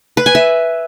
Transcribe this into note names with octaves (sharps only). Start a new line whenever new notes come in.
B4
G#5
E5